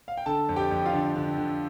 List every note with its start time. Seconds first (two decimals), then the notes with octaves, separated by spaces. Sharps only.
0.08 F5
0.17 G5
0.26 D3 A4 A5
0.49 F2
0.56 G4 G5
0.71 F2
0.86 F4 F5
0.93 D3
1.15 D3
1.38 D3